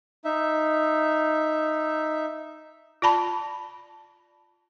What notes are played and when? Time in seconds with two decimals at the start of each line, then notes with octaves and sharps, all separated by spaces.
0.25 D#4 E5
3.02 F4 D5 A5 B5